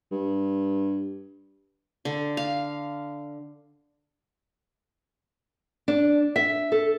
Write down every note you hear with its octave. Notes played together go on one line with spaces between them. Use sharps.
G2
D3
F5
D4
E5
A4